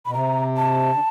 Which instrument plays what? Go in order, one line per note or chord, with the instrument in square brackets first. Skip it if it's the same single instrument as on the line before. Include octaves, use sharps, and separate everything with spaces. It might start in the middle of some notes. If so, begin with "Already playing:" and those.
[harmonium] B2 [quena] B5
[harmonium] C3 [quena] A#5
[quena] A5
[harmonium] D3